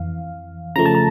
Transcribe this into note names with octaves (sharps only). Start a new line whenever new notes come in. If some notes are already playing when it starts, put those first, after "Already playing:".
Already playing: F2 E3 F5
C#3 F3 A3 A#5
A5
A#5